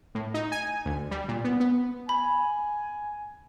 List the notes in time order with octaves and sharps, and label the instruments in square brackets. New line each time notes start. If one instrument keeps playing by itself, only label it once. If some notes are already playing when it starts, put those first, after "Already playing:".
[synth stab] A2
D#4
G#5
D2
G3
A#2
B3
B3
[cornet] G#5 [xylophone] B5